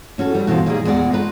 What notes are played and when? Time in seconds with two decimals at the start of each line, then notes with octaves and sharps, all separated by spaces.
0.18 A2 C#4 F#4 A4
0.35 F#3 G3
0.47 G2 B2 E3 F4 C5 F5
0.66 A#2 D#3 G3 A#3 D#4 G#4
0.85 E2 A#2 G#3 D5 F#5
1.11 A3 D#4 F4 B4 A#5